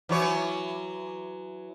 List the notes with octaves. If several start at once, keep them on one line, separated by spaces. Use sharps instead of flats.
E3 F#3 C#5